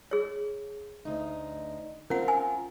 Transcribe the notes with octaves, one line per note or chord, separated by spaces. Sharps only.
G#4 C#5
D2 D#4
C4 C#4 F4 A#4 F#5
G#5